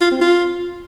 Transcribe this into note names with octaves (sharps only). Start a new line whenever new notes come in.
F4
C4
F4